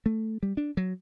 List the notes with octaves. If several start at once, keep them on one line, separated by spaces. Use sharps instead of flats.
A3
G3
D4
F#3